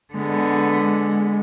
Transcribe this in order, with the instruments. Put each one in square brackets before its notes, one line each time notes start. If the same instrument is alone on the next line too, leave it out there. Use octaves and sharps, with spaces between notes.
[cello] D3 B3 [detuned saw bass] G#3